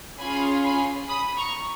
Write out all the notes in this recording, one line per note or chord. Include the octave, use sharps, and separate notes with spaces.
C#4 F4 G#4 G#5 B5
G#5 B5
B5 D#6
A#5 C#6